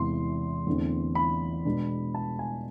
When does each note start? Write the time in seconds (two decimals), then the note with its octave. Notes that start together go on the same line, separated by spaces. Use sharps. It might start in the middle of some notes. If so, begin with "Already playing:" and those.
Already playing: E2 C3 E3 G#3 C6
0.67 E2 D3 A3 C4
1.15 B5
1.65 B2 G#3 B3 D4
2.15 A5
2.39 G#5